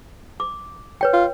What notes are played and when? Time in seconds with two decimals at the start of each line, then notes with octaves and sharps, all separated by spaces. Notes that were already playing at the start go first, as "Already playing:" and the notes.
0.40 D6
1.01 B4 C#5 G5
1.13 F4